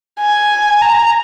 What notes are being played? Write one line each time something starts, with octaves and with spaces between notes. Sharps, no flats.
G#5
A#5